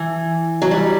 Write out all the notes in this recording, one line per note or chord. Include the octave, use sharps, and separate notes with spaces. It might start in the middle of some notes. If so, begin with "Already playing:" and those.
Already playing: E3
F#3
G3